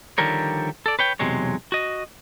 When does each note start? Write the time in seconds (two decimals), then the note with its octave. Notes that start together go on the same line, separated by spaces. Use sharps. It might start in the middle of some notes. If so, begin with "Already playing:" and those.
0.18 D3 D#3 F3 G3 A#4 C#5
0.86 A4 D5
0.99 B4 C#5 G5
1.19 B1 E2 C3 F#3 G#3 C#5
1.72 F#4 D#5